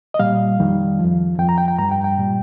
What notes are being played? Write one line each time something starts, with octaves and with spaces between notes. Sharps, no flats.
D#5
A#2 G3 F5
F2 D#3 G3
F2 F3
F2 F3 G5
A#5
G5
G5
G2 G3 A#5
G5
G5
A#2 G3